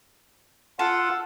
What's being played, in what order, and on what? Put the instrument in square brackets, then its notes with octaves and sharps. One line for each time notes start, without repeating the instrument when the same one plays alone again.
[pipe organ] F4 [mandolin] A4 [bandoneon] F#5